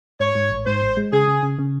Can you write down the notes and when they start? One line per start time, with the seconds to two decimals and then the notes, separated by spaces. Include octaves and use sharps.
0.20 G#2 C#5
0.35 G#2
0.50 A1
0.66 G#2 C5
0.82 A1
0.97 G#3
1.13 C#3 G#4
1.28 C#3
1.43 C#3
1.59 C#3